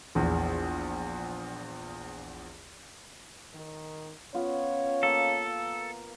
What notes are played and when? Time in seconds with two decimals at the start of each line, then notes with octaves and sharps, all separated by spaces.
0.15 A#1 E2
3.54 D#3
4.34 B3 C#4 F4 C#5
5.03 A#3 A4